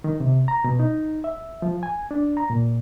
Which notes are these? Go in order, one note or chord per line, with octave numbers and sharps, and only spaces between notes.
D#3
C3
A#5
B2
D#4
E5
F3
G#5
D4
A#5
A#2